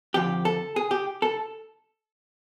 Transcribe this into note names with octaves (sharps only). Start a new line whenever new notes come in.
F2 D3 F3 G4
A4
G#4
G4
A4